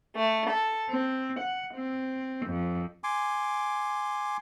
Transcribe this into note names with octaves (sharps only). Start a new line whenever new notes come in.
A3
A4
C4
F#5
C4
F2
G#5 C6 D6